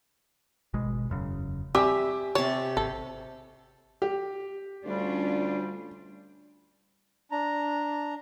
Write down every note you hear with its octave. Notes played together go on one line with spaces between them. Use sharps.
G#1 B2 G#3
E1 F#2 C#3
G3 C4 G4 E5 G#5 D6
C3 C#5 A5
G#1 A4
G4
D2 G3 C#4 D4 F4
D4 A#5